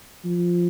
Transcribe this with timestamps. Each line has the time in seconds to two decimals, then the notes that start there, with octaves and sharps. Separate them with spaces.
0.25 F3